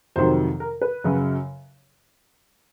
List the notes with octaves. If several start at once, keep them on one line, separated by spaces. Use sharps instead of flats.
F2 C3 D#3 F#3 C5
A#4
B4
F#2 C#3 F#3